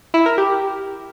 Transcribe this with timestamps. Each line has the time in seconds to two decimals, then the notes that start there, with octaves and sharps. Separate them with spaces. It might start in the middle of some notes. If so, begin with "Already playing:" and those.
0.14 E4
0.26 A#4
0.38 G4